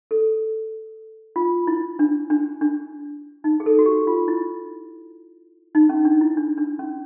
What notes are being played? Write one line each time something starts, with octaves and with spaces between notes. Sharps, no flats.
A4
F4
E4
D4
D4
D4
D#4
G#4
A4
F#4
G4
F4
E4
D#4
C#4
D4
E4
D4
D4
C#4